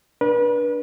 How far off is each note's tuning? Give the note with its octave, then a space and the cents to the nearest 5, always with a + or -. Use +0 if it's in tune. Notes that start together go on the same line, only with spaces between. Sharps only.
D4 +0 B4 -35